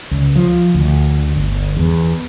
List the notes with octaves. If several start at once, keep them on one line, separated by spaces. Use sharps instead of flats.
C#2
F3
D2
G1
E2